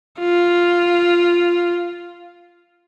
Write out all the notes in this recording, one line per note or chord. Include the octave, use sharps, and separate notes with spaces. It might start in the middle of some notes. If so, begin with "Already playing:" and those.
F4